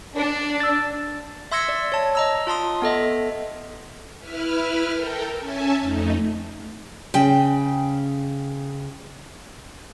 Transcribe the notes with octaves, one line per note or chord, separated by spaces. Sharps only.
D4
E6 A6
E5 C6 E6 G#6 A#6 C#7
D5
C#5 A5
D#5 A#5 E6
F4 A5 C6 D#6
B3 A4 D#5 E5
E4 B4 F6
A4 A#4 G5
C#4 E5 G#5 A5
F2 A3 D#4
C#3 G5